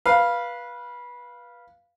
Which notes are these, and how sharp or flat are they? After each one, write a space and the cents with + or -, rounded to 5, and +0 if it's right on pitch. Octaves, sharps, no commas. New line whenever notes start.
B4 -20 F5 -5